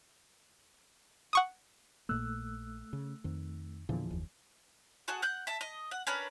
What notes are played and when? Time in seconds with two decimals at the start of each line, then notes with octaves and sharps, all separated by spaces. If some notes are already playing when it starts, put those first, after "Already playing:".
1.33 F#5 C#6 D#6
2.09 A#1 A#2 A3 A#3 E6 F#6
2.93 C#3
3.24 F2 D#3
3.89 E2 A#2 D3 E3 F3
4.11 F#1 D#2
5.08 F#4 G#4 A4 F#5
5.22 F#5 F#6 G6
5.47 E5 A5
5.61 D#5
5.91 F#5
6.07 C#4 D4 A#4 B4